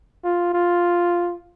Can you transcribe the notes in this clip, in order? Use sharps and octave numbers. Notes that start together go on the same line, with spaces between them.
F4
F4